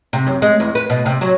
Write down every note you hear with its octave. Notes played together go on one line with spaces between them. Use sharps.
C3
F#2
G#3
E2
B4
B2
C3
F#3